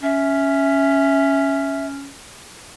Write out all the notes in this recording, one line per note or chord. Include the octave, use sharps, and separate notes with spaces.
C#4 E5